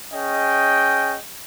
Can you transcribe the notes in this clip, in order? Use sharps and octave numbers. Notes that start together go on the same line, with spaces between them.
C#4 G#4 D#5 G5